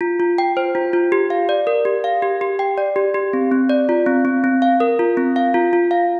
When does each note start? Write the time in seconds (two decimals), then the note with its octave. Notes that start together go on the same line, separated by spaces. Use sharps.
0.01 F4
0.20 F4
0.38 G5
0.57 C5
0.75 F4
0.93 F4
1.12 G4
1.30 F5
1.49 D5
1.67 A#4
1.85 G4
2.04 F5
2.22 G4
2.41 G4
2.59 G5
2.78 D5
2.96 G4
3.14 G4
3.33 C4
3.52 C4
3.69 D5
3.89 F4
4.06 C4
4.25 C4
4.44 C4
4.62 F5
4.80 A#4
4.99 F4
5.17 C4
5.36 F5
5.54 F4
5.73 F4
5.91 F5